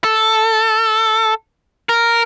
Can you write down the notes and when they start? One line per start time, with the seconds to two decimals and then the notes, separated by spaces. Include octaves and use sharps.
0.04 A4
1.89 A#4